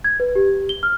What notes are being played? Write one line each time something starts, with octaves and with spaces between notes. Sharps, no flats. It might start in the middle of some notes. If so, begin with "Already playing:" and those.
G#6
B4
G4
G7
F6